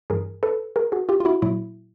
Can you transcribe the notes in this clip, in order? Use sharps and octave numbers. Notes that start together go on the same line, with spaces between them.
G2 E3 G#4 A#4
A4 B4
G#4 A#4
F#4 G#4
F4 G4
F4
E4 F#4
A#2 F#3 E4